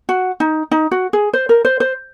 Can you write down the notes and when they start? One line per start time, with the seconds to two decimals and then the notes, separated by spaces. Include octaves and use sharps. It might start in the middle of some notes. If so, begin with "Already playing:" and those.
0.09 F#4
0.40 D#4
0.71 D#4
0.91 F#4
1.13 G#4
1.33 C5
1.49 A#4
1.65 C5
1.80 C5